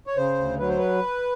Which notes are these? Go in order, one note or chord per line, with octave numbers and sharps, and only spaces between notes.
C#5
C#3 C5
D2
F#3 B4
C5
B4